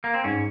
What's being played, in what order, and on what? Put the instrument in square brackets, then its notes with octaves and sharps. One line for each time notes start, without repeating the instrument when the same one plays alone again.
[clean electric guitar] A#3
C4
[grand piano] G#2 [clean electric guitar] C#4